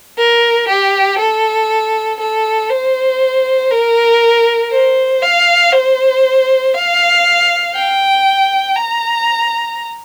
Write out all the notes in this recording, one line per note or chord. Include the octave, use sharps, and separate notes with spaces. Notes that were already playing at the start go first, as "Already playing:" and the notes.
A#4
G4
A4
A4
C5
A#4
C5
F5
C5
F5
G5
A#5